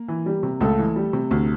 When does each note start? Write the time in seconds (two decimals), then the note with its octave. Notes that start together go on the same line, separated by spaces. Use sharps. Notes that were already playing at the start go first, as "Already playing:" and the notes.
Already playing: A#3
0.08 E3
0.26 G3
0.43 C3
0.61 C#2 A3 A4
0.79 E3
0.96 G3
1.13 C3
1.31 D2